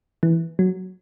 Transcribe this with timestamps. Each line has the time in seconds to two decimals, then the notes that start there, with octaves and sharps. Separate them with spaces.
0.23 E3
0.59 F#3